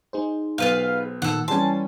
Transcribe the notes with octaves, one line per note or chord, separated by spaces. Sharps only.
D#4 G#4 C5
B1 F4 B4 F5
A#2 D#3 A4 F#5
E3 G3 C#4 G#5 A5 C6